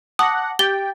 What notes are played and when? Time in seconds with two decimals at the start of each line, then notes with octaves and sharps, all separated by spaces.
0.19 F#5 A5 D6 D#6 A#6
0.59 G4 G5 A6 G7